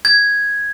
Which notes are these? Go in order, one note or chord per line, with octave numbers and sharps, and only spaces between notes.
G#6